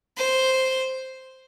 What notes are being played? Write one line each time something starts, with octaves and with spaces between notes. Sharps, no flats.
C5